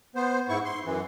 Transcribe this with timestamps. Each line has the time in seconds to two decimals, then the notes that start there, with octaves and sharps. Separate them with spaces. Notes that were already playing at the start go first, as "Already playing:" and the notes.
0.15 B3 C5
0.49 G#2 E4 C#6
0.65 C6
0.85 F#2 E3